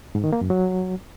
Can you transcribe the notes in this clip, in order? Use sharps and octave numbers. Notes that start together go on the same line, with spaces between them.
G#2
D#3
A#3
F#2
F#3